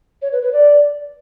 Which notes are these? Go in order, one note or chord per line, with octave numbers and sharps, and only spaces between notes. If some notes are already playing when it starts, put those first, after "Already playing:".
C#5
B4
B4
D5